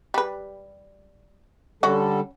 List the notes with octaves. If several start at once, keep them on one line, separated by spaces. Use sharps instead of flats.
G3 B4
D3 G3 C#4 F#4 A4